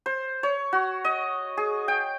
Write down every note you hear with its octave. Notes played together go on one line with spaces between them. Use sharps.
C5
C#5
F#4
D#5
G#4
G5